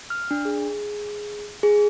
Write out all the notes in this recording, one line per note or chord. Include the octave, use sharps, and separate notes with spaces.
F6
D4
G#4
G#4